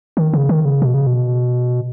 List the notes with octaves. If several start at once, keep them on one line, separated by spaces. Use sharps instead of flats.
D#3
C#3
D#3
C#3
B2
C#3
B2